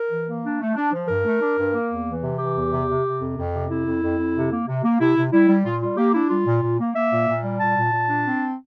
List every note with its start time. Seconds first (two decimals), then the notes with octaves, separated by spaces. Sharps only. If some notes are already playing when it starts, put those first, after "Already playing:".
Already playing: A#4
0.11 E3
0.27 A#3
0.44 D4
0.60 A3
0.76 D4
0.92 F3
1.08 G2 A#4
1.25 A3
1.41 D4
1.58 G2
1.74 A#3
1.90 E2
2.07 E3
2.23 C3
2.39 E3 G4
2.56 E2
2.71 C3
2.88 C3
3.05 C3
3.20 F2
3.37 F2
3.54 C3
3.69 F2 E4
3.86 F2
4.02 F2
4.19 F2
4.35 C3
4.50 A#3
4.67 C3
4.84 A#3
4.99 C3 E4
5.16 C3
5.32 G3 E4
5.48 G3
5.65 A#2 F4
5.81 G3 F4
5.97 A#3 G4
6.14 D4 E4
6.30 G3 F4
6.46 A#2
6.62 A#2
6.79 A#3
6.95 A#3 E5
7.12 A#2
7.27 A#2
7.44 G3
7.60 A#2 A5
7.77 A#2
7.93 A#2
8.09 D4
8.26 C4